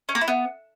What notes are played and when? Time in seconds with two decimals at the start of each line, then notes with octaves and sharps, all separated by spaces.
0.09 C#4
0.15 A#3
0.21 E4
0.28 B3